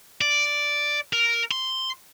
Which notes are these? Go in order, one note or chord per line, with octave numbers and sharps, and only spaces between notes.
D5
A#4
C6